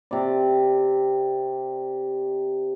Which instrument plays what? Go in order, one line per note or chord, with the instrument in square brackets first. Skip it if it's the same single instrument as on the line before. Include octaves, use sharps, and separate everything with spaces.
[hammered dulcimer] C3 D5